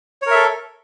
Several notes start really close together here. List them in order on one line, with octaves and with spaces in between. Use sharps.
C#5 A#4 E5 A4